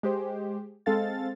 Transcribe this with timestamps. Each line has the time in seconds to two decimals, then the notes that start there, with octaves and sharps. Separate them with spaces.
0.03 G#3 G4 C5
0.86 G#3 C4 A4 F5 A6